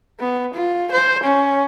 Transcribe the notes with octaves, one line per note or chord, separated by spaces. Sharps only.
B3
F4
C5
C#4